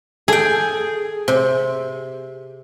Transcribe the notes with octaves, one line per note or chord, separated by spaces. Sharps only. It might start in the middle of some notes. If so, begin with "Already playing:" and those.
G#4 A4 G5
C3